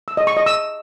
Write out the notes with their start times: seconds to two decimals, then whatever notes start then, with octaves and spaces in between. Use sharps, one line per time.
0.08 E6
0.17 D#5
0.27 C#6
0.37 D#5
0.46 E6